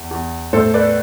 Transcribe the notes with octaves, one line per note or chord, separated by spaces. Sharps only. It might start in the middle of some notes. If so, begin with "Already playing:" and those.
Already playing: E2
E2
A2 A4 C5
B4 D5